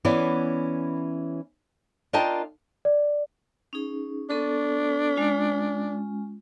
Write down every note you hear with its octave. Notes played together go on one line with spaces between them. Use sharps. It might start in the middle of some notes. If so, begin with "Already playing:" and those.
E3 B3 C#4 E4 D5
D4 F4 A#4 D#5 G5 A5
D5
C#4 D#4 G#4
B3 D4 A4 C#6
G#3 C#4 F4